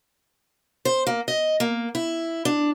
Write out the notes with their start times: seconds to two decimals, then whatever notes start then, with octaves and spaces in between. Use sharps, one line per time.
0.85 C5
1.07 A#3
1.28 D#5
1.60 A#3
1.95 E4
2.45 D4